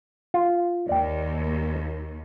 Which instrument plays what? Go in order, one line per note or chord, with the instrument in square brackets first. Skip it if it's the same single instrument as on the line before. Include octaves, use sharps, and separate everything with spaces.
[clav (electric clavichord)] F4
[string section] D#2 [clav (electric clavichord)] D5 G5